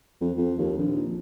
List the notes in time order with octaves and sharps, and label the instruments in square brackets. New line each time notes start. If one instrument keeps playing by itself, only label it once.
[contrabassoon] F2
F2
D#2
A#1